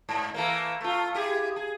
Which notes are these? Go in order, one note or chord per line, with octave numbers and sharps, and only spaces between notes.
G#2
E3 A3 A#3
A3 F4
E4 G4 G#4
G#4